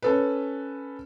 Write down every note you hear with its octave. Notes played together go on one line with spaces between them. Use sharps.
C#4 A4 B4